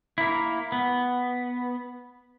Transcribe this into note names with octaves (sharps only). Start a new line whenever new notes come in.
A#3 E4
B3